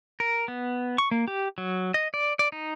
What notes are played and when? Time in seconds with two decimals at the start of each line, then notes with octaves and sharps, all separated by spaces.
0.20 A#4
0.48 B3
0.98 C#6
1.11 A#3
1.28 G4
1.58 F#3
1.94 D#5
2.14 D5
2.39 D5
2.52 D#4